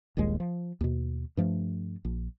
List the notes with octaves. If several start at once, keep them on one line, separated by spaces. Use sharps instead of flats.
D#1 A#1 D#2 G#3
F3
D#2 B2
G2 F3 A3
A#1